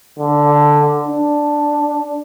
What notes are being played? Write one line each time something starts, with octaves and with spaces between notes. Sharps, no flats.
D3
D4